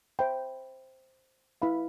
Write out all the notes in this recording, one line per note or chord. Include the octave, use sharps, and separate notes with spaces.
C5 E5 G5 B5
E4 B4 F5 B5